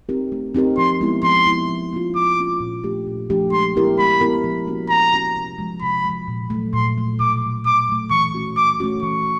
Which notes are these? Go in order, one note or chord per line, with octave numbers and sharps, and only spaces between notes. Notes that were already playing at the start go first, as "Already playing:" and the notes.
C4 D#4 G4 A#4
A3
C4 D#4 G4 A#4
F3 C6
G#3 B3 E4
F3 C6
G#3 B3 E4
F3
A#3 C#4 F4
F3 D6
A#3 C#4 F4
A#2
F3 A3 D4 G4
A#2
F3 A3 D4 G4
G#3 C6
B3 E4 G4 A#4
G#3 B5
B3 E4 G4 A#4
F3
A#3 C#4 F#4
F3 A#5
A#3 C#4 F#4
C3
F3 G#3
C3 B5
F3 G#3
A#2
F#3 A3
A#2 C6
F#3 A3
B2 D6
F#3 A3
B2 D6
F#3 A3
E3 C#6
A3 C#4 F#4
E3 D6
A3 C#4 F#4
E3 C#6